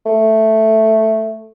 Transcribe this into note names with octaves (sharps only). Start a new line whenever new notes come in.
A3